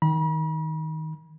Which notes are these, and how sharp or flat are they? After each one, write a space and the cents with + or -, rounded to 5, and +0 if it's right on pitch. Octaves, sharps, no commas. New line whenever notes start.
D#3 +20 B5 -40